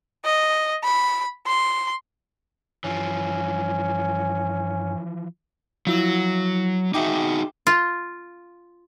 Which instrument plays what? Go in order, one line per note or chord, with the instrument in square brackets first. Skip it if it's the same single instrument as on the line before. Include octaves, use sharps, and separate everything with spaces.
[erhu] D#5
B5
C6
[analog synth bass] G2 [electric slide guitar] E3 F3 [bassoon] C#4
[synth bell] F3 E4 F#7 [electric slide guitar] F#3
[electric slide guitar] D#4 F#4 G#4 [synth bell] E5 G5 D6
[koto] F4